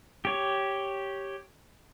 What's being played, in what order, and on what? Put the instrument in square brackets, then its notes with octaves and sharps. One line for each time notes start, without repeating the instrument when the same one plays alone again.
[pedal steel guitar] G4 C#5